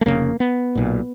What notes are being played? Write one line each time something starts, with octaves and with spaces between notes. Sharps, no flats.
A3
F1 D#2 C#3 A#3
B3
B1 A#2